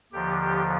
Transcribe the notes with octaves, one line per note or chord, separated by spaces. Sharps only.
D#2 D3 F3 G4
G4